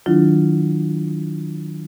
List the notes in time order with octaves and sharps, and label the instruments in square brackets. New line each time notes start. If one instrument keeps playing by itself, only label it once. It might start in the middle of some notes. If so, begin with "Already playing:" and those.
[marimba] D#3 F#3 D4 E4 F4